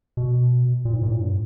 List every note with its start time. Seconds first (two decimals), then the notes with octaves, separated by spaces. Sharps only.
0.17 B2
0.85 A#2
0.94 G#2
1.03 A#2
1.11 A2
1.19 G2